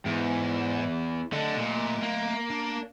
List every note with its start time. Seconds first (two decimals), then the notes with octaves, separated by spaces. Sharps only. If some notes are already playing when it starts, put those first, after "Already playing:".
0.06 E2 G#2
1.32 D3 A3 D#5
1.57 A#2
2.03 A#3
2.50 D4